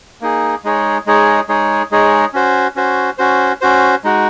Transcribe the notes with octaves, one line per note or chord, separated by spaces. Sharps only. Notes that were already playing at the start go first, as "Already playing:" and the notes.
A#3 D#4 G#4
G#3 D#4 G#4 C#5
G#3 D#4 G#4 C#5
G#3 D#4 G#4 C#5
G#3 D#4 G#4 C#5
C#4 F#4 C5
C#4 F#4 C5
C#4 F#4 C5
C#4 F#4 C5
G#3 D#4 F#4